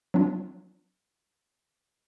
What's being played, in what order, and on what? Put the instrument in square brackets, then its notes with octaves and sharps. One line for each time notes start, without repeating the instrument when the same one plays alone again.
[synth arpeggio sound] F#3 C4 D4 F4